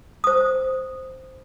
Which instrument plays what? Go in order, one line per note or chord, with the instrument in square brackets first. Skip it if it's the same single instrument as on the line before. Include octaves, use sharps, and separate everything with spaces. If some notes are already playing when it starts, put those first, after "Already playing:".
[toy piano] C5 D#6